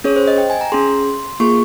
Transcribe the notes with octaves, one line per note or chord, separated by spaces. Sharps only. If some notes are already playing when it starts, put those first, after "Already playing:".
C#4 G#4 C#5
C5
D#5
G5
G#5
A#5
C#4 G#4 C6
A#3 F4 G#4 C#6